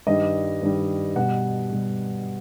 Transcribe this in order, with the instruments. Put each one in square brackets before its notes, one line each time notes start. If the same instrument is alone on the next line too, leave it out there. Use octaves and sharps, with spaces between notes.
[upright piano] G2 D#3 G3 D#5
G2 D#3 G3
B2 G3 F#5
B2 G3